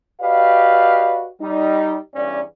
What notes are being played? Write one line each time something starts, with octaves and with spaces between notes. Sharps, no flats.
F#4 G4 B4 D5 D#5 F5
G3 D#4
E2 G2 C#4 D5